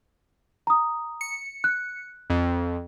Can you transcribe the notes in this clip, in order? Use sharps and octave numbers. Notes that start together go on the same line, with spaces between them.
A#5 D#6
C#7
F#6
F2